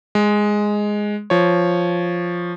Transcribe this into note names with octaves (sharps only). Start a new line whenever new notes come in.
G#3
F3 C#5